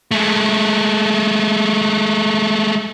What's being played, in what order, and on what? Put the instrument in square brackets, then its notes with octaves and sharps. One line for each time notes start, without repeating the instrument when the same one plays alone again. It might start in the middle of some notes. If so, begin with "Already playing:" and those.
[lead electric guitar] G#3 A3